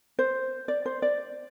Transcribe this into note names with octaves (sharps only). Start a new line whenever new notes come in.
C5
D5
C5
D5